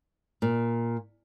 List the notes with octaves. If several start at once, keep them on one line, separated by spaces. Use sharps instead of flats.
A#2